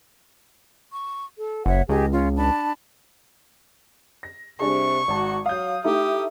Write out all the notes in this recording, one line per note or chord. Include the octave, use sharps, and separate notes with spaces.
C#6
A4
F#1 C#5 E5 F#5
C#2 G4 G#4 D#5
C#4 F4
D4 A5 B5
A#6
C3 G3 D4 G#4 C#6
G#1 F#4 A5
F#3 F5 D#6 G6
A3 D#4 E4 G4 D#6